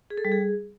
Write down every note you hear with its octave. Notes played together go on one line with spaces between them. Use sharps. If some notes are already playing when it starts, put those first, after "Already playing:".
G#4
A4
G3
G#4